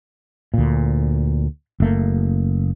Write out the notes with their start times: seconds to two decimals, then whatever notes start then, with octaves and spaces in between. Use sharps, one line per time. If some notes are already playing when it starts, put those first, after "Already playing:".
0.54 D2 A#2
1.80 F#1 A3 A#3